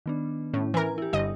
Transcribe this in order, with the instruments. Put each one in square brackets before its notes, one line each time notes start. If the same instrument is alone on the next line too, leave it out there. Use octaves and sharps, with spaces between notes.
[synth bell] D#3 B3 D4
[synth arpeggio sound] A2 [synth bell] C#4
[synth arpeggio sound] E3 A#4 [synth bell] G#5
[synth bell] E4 G4
[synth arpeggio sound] G1 D#5